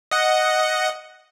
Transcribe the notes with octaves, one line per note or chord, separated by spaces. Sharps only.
D#5 F#5